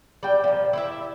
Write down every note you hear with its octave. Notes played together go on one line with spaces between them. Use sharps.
G3 G5
A#2 F3
E4 G4 E5